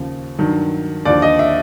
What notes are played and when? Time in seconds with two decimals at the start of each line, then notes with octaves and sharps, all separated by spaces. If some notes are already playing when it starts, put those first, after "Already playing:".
Already playing: D#2 C#3 F3
0.38 G2 D#3 F#3
1.05 D#2 D3 F3 D5
1.22 D#5
1.39 E5